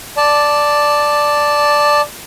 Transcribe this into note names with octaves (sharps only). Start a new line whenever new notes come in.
D5 A5